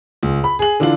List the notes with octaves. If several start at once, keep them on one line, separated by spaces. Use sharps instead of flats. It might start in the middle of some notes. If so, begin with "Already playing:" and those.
C#2
B5
G#4 F#7
D3 E3 D4 F4 F#7